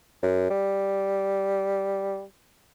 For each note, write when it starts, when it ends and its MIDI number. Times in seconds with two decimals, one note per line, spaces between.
0.23 0.48 42
0.50 2.23 55